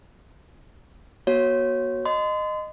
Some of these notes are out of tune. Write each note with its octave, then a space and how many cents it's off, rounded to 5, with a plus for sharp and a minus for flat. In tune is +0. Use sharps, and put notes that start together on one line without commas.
B3 -45 F#4 +0 C#5 -15
D#5 -15 C6 -35